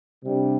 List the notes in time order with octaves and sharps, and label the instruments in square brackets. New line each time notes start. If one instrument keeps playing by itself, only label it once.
[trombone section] C3 G3 D4